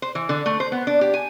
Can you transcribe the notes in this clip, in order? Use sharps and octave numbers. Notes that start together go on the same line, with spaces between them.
C5
E3
D3
A3
C5
B3
D4
G4
G#5